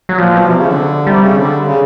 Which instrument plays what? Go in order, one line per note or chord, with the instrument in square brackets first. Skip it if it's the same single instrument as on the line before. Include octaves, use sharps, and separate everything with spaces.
[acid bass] F#3
[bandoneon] A#2 [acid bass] F3
[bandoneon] B2
C3
C#3
D3
[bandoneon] C3 [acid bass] G3
[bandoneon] C#3
D3
C#3